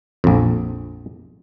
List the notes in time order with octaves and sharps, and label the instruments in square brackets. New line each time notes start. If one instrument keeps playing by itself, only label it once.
[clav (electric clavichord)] A#1 F2